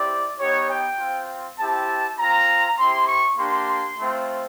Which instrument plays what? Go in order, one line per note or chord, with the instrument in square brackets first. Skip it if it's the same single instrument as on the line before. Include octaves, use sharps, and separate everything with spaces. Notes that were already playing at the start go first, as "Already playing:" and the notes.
Already playing: [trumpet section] C4 E4 G4 D5
B3 D#4 G4 C#5
G5
C4 F4
C4 E4 G4 A5
C4 F4 A#5
C4 E4 G4 C6
C#6
A#3 D4 G4 C6
A3 C4 F4